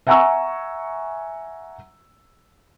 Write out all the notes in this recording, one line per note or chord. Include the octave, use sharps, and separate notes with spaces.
E5 F#5 G#5 A#5 C#6 E6